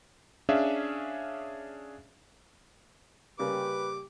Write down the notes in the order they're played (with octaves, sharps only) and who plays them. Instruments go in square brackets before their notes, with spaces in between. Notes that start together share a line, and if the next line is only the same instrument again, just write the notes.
[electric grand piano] C#4 D4 G#4 E5 F5
[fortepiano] C#3 G3 A#3 [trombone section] G4 [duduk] B4 [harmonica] D6